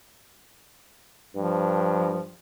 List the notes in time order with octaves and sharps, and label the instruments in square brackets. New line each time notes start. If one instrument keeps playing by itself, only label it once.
[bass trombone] G2 [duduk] F3